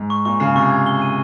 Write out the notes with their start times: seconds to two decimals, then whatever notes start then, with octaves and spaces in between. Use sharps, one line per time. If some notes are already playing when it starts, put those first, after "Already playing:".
Already playing: G#2
0.10 C#6
0.25 A#2 C#6
0.40 C#3 C7
0.55 C3 C#6
0.71 G#6
0.86 G7
1.02 D#7